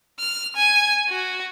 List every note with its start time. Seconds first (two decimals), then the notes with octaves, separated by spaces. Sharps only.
0.19 F6
0.56 G#5
1.09 F#4